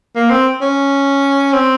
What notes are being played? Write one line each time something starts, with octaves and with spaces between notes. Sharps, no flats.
A#3
C4
C#4
C4